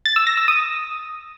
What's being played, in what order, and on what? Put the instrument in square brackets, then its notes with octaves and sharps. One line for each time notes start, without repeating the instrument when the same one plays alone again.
[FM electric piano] A6
E6
A#6
E6
D#6